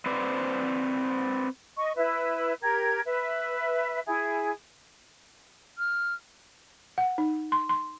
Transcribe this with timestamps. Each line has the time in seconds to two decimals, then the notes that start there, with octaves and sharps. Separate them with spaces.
0.06 C4 B4 C5 D5
1.77 D#5 C#6
1.97 E4 B4 E5
2.62 G4 A#4 G#6
3.05 B4 E5
4.07 E4 G#4
5.78 F6
6.98 F#5
7.18 D#4
7.52 C6
7.69 C6